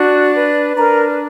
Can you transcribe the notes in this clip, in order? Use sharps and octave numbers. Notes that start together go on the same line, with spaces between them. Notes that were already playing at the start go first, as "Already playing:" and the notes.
Already playing: D4 F#4
B4
D4 A#4 A#5